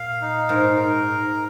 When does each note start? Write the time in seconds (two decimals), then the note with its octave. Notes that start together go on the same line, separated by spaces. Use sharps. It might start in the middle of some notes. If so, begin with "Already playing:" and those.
Already playing: A#2 F5
0.22 D#4
0.49 G#2 A#4
0.77 A#4